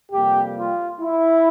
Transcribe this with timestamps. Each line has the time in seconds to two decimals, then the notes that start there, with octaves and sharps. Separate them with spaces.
0.12 F2 C3 G3 A#3 G4
0.57 F4
1.01 E4